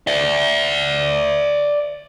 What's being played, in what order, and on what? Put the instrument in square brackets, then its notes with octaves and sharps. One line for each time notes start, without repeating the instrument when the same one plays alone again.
[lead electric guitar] D5 E5